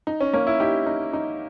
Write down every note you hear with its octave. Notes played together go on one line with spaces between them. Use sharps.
D#4
C#4
A#3 C#4
E4
D#4 G4
D#4
D#4